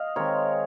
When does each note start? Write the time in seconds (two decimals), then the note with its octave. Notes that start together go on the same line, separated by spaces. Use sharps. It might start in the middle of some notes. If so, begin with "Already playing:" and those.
Already playing: D#5 F5
0.16 D#3 G#3 C4 A#4 C#5